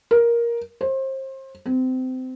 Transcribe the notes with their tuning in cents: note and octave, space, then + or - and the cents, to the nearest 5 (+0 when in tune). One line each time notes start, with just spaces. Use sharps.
A#4 +10
C5 +30
C4 -25